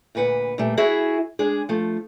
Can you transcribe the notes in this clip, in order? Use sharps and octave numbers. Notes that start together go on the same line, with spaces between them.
D2 A#2 B4 F#5
A#2 G3 A3
E4 F#4 G#4 E5
G#3 D4 G#4
F3 A3